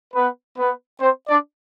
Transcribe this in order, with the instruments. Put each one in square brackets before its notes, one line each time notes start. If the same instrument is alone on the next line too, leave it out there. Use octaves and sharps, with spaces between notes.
[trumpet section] B3 B4
B3 B4
C4 C5
D4 D5